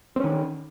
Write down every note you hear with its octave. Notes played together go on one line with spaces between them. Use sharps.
D#3 C4 C#4